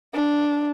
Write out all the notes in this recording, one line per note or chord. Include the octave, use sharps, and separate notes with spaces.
D4